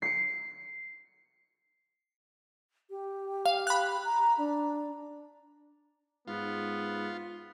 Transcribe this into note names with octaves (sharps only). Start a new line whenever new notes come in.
C7 C#7
G4
F5
B5 F#6
A#5
D4
G#2 B3 F4